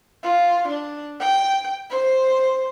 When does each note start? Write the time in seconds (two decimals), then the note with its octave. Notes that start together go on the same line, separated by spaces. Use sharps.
0.23 F4
0.68 D4
1.20 G5
1.90 C5